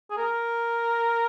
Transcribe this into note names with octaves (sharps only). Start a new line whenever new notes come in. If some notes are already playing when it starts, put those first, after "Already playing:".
G#4
A#4